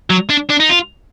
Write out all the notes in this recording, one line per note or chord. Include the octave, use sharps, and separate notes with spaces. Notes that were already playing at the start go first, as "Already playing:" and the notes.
F#3
D4
D4
D#4
F4